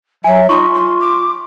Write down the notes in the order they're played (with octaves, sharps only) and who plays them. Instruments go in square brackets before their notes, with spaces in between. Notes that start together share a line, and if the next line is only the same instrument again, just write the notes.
[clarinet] F#3 [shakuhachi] E5 [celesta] G#5
[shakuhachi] D#4 [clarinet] F4 [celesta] C#6
[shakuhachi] C6
D6